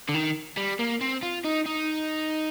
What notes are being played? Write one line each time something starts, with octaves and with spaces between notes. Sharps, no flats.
D3
D#3
G3
A#3
C4
F4
D#4
D#4